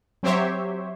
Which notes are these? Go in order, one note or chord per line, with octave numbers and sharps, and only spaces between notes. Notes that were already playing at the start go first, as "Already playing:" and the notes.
F#3 C4 G4 C5 C#5 E5